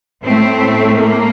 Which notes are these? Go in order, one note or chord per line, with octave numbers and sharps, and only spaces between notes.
A2 A3 C4
A#3